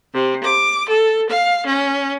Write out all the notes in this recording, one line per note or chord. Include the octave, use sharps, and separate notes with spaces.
C3
D6
A4
F5
C#4